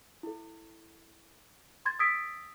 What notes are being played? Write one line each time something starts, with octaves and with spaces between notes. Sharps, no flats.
E4 A4
C6 G#6 A6
D#6 E6 G#6 A6 B6 D7